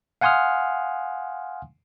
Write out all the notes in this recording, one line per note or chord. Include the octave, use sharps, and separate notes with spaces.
F5 F#5 G#5 C6 D#6 F6